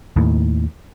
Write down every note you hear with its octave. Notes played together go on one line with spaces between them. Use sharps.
D#2 A2